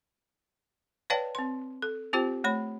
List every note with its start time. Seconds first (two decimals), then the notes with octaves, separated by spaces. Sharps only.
1.10 B4 C#5 D5 F5 G5 A5
1.35 C4 C6
1.82 A4
2.13 C4 F4 G4 C5 G5
2.44 A3 C#5 B5